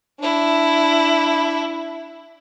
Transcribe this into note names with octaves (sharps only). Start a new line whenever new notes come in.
D4 E4